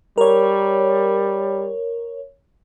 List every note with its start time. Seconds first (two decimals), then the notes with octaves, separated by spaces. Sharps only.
0.18 G3 A#4 C#5